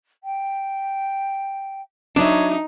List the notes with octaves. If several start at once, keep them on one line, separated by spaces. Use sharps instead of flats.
G5
F#3 D4 D#4 B4 C#5 E5